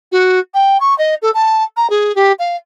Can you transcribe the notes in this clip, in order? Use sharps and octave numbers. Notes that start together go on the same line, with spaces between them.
F#4
G5
C#6
D#5
A4
A5
A#5
G#4
G4
F5